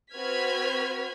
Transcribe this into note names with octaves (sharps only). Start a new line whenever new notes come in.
C4 F#4 B4 F6 G#6 B6